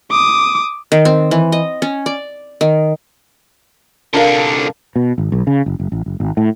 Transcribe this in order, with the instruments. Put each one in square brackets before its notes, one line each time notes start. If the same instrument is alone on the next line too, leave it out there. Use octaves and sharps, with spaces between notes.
[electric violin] D6 D#6
[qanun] D#3
C4
E3
D#5
C#4
D5
D#3
[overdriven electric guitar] C2 D3 [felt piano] D4 A#4 F5
[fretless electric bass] B2
G#1
B1
C#3
F#1
F#1
A1
F#1
G#1
A2